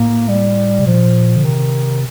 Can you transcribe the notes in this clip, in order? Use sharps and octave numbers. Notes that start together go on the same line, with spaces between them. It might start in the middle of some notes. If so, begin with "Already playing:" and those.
Already playing: A2 A#3
G3
C3
A#2 F3
D3
C3 D#3